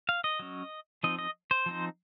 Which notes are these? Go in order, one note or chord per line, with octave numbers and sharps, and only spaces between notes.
F5
D#5
F#3 C#4
F3 C4 D#4 D#5
D#5
C5
F3 C4 D#4